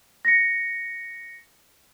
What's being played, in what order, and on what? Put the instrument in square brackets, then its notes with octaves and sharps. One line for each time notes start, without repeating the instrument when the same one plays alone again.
[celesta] A#6 C#7